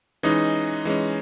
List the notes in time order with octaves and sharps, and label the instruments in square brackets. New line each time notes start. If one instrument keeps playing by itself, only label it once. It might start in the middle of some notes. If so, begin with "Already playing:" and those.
[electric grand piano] E3 G#3 C#4 [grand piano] D#4
[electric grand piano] E3 G#3 C#4